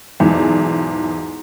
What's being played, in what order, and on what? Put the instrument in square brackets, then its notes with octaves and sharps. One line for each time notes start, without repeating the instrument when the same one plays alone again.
[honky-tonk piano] B1 E2 G#2